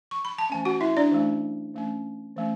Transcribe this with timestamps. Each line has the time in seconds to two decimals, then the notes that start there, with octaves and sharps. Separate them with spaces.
0.11 C#6
0.25 B5
0.38 A5
0.50 E3 A3 C#4 G#5
0.65 F#4 F#5
0.81 E4 E5
0.97 D4 D5
1.12 E3 A3 C#4
1.74 E3 A3 C#4
2.37 E3 A3 C#4